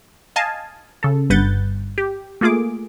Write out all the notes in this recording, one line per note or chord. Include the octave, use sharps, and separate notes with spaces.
D#5 F5 G#5 A5
C#3 A4
G1 G2 B4 F#5 G6 A6
G4
A3 A#3 F4 G#4 D6